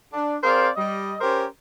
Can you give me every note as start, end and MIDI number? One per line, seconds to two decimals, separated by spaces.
0.13 0.38 62
0.43 0.69 60
0.43 0.69 68
0.43 0.69 70
0.43 0.69 72
0.43 0.69 74
0.43 0.69 77
0.77 1.16 55
0.77 1.16 75
1.21 1.45 61
1.21 1.45 67
1.21 1.45 70
1.21 1.45 72